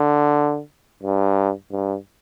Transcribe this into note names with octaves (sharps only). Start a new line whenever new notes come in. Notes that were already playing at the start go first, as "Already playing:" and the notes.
Already playing: D3
G2
G2